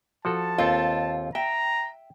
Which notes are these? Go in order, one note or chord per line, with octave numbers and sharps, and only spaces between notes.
F3 F#4 A4 A5
D#2 C4 F4 A4
E5 G5 A#5